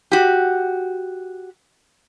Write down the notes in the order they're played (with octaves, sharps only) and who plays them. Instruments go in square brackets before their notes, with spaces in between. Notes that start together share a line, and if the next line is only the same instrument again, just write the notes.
[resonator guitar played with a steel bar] F#4 G4